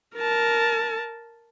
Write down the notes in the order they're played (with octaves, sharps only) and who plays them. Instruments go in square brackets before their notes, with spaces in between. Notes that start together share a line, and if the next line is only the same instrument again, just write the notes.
[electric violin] A#4 A5